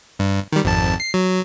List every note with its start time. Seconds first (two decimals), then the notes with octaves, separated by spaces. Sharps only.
0.19 G2
0.52 D#3 G3
0.64 G#1 F2 A5
1.00 C7
1.14 F#3